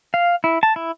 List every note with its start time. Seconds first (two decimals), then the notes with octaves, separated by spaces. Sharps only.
0.14 F5
0.44 E4
0.63 A5
0.76 E4